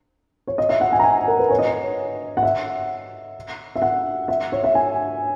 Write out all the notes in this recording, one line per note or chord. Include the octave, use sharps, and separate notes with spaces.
C#5
D#5
E5
F#5
G#5
A#5
G#5
A#4
B4
C#5
D#5
C#5
F#5
E5
E5
F#5
E5
C#5
E5
G#5